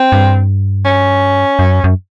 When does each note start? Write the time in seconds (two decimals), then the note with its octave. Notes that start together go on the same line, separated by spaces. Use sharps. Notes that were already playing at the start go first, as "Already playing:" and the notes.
Already playing: C4
0.12 G2
0.85 C#4
1.59 F#2
1.84 F#2